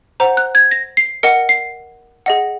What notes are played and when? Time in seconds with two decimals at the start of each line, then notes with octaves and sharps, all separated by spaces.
0.20 C5 F#5 A#5
0.37 F#6
0.55 G#6
0.71 A#6
0.97 C7
1.23 A#4 D#5 F#5 C#7
1.49 C7
2.26 G#4 D#5 F#5